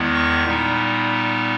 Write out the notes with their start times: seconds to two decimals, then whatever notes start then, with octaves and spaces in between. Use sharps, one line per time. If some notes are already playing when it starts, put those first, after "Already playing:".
Already playing: E2 D#3 G#3 B3 E4
0.15 C#6
0.45 A#2 G3 B3 D#4